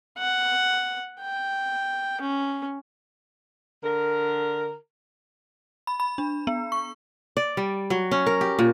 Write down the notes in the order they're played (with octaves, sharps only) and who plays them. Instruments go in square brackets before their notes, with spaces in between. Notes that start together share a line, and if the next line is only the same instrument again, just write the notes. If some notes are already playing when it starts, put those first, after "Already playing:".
[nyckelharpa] F#5
G5
C#4
[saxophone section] D3 A#4
[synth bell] B5
B5
D4
B3
C#6
[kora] D5
G3
F#3
C#4
A#4
G4
A#2